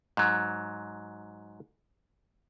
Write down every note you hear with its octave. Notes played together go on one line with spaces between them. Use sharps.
G#2 F#3